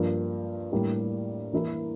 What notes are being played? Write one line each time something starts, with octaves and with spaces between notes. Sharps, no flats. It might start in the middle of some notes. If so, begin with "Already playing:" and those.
Already playing: G2 F3 A#3
A2 G3 A#3 D4 G4
E3 A#3 E4 A#4